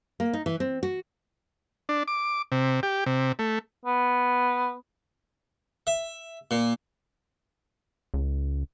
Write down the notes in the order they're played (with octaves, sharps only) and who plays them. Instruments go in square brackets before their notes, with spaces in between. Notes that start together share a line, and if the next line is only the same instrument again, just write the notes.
[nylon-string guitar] A#3
D#4
E3
C4
F#4
[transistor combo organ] D4
D6
C3
G4
C3
A3
[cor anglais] B3
[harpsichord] E5
A#2
[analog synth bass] C#2